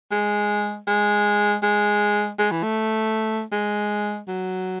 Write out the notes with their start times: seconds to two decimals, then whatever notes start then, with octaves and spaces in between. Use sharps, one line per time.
0.11 G#3
0.87 G#3
1.63 G#3
2.39 G#3
2.52 E3
2.63 A3
3.52 G#3
4.28 F#3